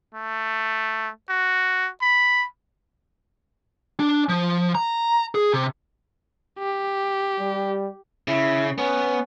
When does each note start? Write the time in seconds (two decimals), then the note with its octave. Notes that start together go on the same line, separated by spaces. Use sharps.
0.15 A3
1.30 F#4
2.02 B5
4.00 D4
4.29 F3
4.75 A#5
5.35 G#4
5.53 C3
6.59 G4
7.39 G3
8.28 C#3 E4
8.78 B3 C#4